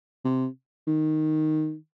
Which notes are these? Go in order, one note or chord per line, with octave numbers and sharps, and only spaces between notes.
C3
D#3